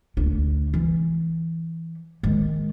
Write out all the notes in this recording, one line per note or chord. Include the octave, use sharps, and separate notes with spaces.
D2 D4
E3
D#3 G#3